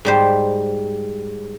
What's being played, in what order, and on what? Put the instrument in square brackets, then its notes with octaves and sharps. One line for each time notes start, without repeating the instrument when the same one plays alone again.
[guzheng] G#2 G3 C5